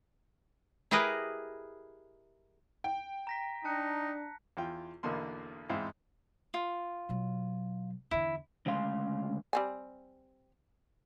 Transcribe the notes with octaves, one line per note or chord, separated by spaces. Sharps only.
E4 G4 G#4 A#4 B4 D#5
G5
A#5 A#6 B6
D4 D#4 A5 F#6 C#7
E2 F4 G5
B1 E2 B2 D3 A#3 C6
E2 G#2 C4 E4 F5
F4
B2 F#3
E2 D3 E4
D2 C#3 G#3 F5 C6
G3 C4 G#5